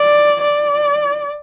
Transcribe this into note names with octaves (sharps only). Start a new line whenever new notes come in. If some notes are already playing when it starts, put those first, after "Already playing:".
Already playing: D5
D5